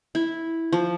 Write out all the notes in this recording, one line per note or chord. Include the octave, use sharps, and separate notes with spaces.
E4
F3